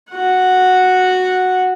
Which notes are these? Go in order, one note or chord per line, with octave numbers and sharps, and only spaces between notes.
F#4 F#5